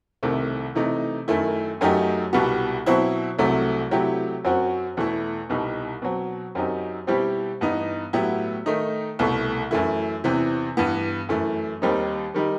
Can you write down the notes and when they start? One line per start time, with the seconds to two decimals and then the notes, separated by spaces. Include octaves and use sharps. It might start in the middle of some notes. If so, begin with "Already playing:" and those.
0.23 C2 C3 D#3 A3
0.75 C3 E3 A3 D#4
1.28 F#2 D#3 A3 E4
1.81 F#2 F#3 A3 D#4 G4
2.33 C2 B2 G3 B3 F#4
2.86 B2 F#3 C4 E4
3.38 C2 C3 F#3 A3
3.91 C3 F#3 A3 E4 G4
4.44 F#2 F#3 C4 F#4
4.97 E2 B2 A3 E4
5.50 C2 B2 G3 D#4
6.02 B2 F#3 C4
6.55 F#2 F#3 C4 D#4 G4
7.07 B2 G3 C4 E4 G4
7.61 G2 E3 B3 D#4
8.13 A2 F#3 B3 E4 G4
8.66 D#3 A3 D#4
9.19 C2 B2 A3
9.71 F#2 E3 A3 E4
10.24 E2 C3 E3
10.77 G2 E3 B3
11.29 F#2 E3 A3
11.82 D#2 D#3 G3 C4 D#4
12.34 D#3 G3 D#4